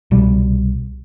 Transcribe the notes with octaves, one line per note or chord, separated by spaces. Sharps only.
C2 B2 G3